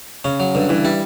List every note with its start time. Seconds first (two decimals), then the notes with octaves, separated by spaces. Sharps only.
0.24 C#3 C#4
0.40 F#3
0.55 G2 D3
0.69 G2 E3
0.84 G3 E4